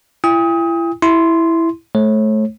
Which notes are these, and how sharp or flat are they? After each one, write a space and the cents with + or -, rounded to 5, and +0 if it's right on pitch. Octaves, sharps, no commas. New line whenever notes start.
E4 +35 G5 +45 D#6 +25
E4 +0 C6 -5
A3 -25 C#5 -35